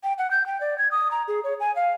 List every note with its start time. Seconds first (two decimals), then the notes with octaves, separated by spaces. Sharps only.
0.04 G5
0.18 F#5
0.31 G6
0.46 G5
0.61 D5
0.78 G#6
0.91 D#6
1.11 A#5
1.28 G#4
1.44 C#5
1.60 G#5
1.76 F5